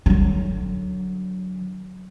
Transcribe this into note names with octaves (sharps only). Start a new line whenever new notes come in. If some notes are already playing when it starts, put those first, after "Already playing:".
D3 F#3